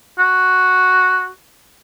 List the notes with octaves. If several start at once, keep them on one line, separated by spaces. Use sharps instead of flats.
F#4